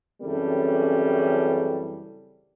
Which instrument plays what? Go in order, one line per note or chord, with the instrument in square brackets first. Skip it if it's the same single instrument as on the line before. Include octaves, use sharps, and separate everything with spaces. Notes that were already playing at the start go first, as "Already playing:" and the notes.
[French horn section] F#2 C#3 E3 G3 C4 A4